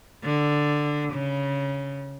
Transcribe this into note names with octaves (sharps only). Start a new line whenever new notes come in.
D3
C#3